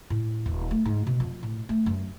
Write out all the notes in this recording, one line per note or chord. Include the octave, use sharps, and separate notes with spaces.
A2
D#1
A3
G#2
B2
F2
A2
A3
F#2